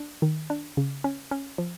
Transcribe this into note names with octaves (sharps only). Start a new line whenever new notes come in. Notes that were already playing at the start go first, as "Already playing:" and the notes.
Already playing: D4
D#3
D4
C#3
C#4
C#4
F3